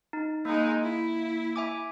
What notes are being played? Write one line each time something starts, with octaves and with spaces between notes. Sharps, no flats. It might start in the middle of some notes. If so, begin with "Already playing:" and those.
D#4
G#3 A#3 D#4
E4
E5 G#5 D6